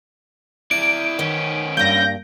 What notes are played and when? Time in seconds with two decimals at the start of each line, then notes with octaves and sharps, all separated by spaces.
0.71 E4 D5 D7
1.19 D#3 B3 C#4
1.77 G2 A#3 G6 A#6